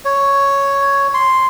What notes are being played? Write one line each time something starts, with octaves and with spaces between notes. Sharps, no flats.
C#5
C6